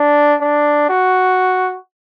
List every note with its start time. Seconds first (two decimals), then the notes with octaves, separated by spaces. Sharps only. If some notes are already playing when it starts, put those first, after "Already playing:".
Already playing: D4
0.41 D4
0.90 F#4